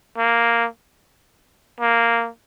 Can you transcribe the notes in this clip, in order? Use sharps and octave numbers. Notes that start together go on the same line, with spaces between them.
A#3
A#3